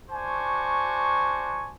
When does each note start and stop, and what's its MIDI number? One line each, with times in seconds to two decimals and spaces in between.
0.10 1.73 62
0.10 1.73 66
0.10 1.73 72
0.10 1.73 80
0.10 1.73 85